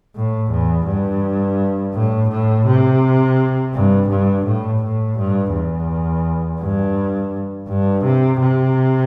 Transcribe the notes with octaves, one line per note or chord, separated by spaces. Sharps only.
A2
E2
G2
A2
A2
C3
G2
G2
A2
A2
G2
E2
G2
G2
C3
C3